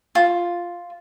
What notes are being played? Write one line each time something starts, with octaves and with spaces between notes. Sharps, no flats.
F4